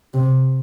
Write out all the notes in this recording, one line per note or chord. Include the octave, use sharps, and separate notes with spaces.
C3